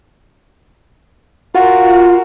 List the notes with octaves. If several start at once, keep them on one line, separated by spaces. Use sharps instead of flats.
F4 F#4 A#4